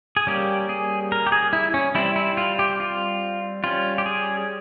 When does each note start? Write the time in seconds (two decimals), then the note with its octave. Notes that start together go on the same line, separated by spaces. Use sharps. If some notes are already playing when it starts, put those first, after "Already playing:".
0.17 G#4
0.27 G3 A#3 C#4 G4
0.69 G#4
1.12 A#4
1.27 G4
1.32 G#4
1.53 E4
1.74 C#4
1.95 G3 C4 E4
2.16 E4
2.37 F4
2.59 G4
2.80 F4
3.64 G3 C#4 F4
3.98 G4
4.06 G#4